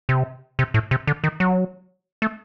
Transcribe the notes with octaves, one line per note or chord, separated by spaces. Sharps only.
C3
C3
A2
C3
D3
D#3
F#3
A3